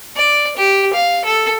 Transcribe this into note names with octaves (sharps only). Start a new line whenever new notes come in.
D5
G4
F5
A4